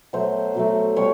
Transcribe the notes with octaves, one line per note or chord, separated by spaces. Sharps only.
B2 F#3 A3 C5
B2 F#3 A3
B2 G3 C#5